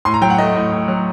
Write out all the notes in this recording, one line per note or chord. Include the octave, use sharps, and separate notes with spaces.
A2 C6
A#5
F#3 G5
F#5
A3 D#5
A2
A2
F#3